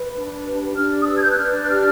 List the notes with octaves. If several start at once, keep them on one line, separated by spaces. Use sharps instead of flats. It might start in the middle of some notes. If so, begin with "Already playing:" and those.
Already playing: B4
D4
G4
D4 F6
D#6
B4 E6
G#6
G6
F#6
D4 F6
F#6
G4 F6